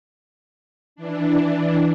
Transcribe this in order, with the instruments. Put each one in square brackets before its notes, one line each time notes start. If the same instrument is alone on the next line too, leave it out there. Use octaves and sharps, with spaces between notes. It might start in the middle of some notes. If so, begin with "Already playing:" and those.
[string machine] E3 D4